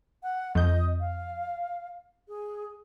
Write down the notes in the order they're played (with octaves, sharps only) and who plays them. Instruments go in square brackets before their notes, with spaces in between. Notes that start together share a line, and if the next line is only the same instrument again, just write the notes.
[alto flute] F#5
[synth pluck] F2 G6 [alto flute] D#5
[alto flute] F5
G#4